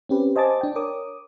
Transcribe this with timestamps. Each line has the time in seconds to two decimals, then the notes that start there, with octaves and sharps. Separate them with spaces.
0.09 C4 C#4 G4 B4
0.36 C5 D#5 G#5 A5 D6 A6
0.61 D4 G5
0.76 A#4 C#5 D6 D#6